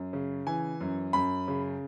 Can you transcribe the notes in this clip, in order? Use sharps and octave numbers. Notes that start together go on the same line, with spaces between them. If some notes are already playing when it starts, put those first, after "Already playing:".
Already playing: F#2
C#3
E3 G#5
F#2
F#2 B5
C#3